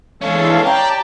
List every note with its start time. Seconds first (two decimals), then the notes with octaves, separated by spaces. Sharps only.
0.22 E3 G#3 C#4 D4 A4 C#5 F5
0.65 G4 D5 G5 A5 A#5